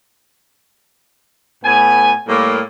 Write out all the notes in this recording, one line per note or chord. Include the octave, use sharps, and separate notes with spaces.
A2 B3 G#5
A2 G3 A#3